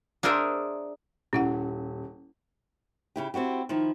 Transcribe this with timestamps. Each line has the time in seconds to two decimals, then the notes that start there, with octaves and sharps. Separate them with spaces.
0.23 D4 G#4 A#4 C5 E5 A#5
1.33 D#1 C#4 E4 F#5
3.16 C#3 E4 G4
3.34 C4 E4 F#4 G4
3.69 D#3 F3 E4